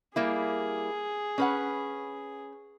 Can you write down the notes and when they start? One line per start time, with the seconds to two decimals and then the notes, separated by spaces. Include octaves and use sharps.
0.16 G3 A#3 E4 G#4
1.38 C#4 B4 F#5